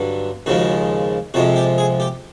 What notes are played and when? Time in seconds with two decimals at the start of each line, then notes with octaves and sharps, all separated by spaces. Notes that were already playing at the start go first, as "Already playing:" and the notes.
Already playing: G2 D3 F#3
0.46 D#2 C#3 F3 G#3 F#4
1.34 F2 C3 F3 G#3 F#4
1.56 G4
1.78 G#4
2.00 G4